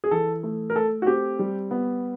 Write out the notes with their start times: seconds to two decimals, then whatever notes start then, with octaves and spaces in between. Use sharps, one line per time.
0.04 G#4
0.11 E3 A4
0.43 A3
0.70 A#4
0.75 A3 A4
1.02 F#4
1.07 C4 G4
1.39 G3
1.71 B3